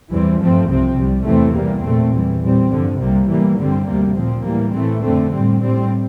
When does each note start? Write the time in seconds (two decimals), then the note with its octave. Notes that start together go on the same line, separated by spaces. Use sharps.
0.11 E2 E3 G3 C4
0.40 G2 F3 A3 C4
0.68 C2 C3 F3 C4
0.97 C2 C3 G3
1.26 E2 C3 E3 A3 C4
1.55 E2 C3 G3 A#3
1.84 A#2 A3 C4
2.13 E2 E3 G3
2.42 A#2 G3 C4
2.71 G2 D3 F3
3.00 C2 C3 G3 A#3
3.29 A2 E3 G3 A#3
3.57 G2 D3 G3 C4
3.87 D2 C3 G3 A#3
4.16 A#2 F3 C4
4.45 A2 E3 G3 A#3
4.73 A2 E3 A3 C4
5.02 F2 D3 A3 C4
5.32 A2 G3 C4
5.60 A2 G3 C4